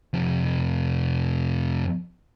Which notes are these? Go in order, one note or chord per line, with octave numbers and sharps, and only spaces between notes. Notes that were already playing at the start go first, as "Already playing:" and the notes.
F2 C3